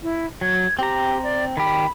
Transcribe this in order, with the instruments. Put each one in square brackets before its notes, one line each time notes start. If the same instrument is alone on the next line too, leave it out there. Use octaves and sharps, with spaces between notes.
[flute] E4
[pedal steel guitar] F#3 [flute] G#6
[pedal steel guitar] C4 A#5 [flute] G4
[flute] D5
[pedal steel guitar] D#3 G4 [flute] B5